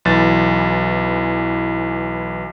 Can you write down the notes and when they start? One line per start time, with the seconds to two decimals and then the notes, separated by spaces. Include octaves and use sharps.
0.05 B1 E3 A6